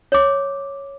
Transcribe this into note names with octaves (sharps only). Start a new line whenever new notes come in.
C#5 D6